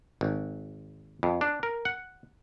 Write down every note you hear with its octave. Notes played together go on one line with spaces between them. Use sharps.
G#1
F2
D4
A#4
F#5